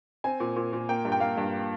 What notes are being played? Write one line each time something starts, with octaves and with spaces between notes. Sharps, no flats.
C4 G#5
A#2
A#2
A#2
A#3 G5
G2
G5
A#3 F5
G2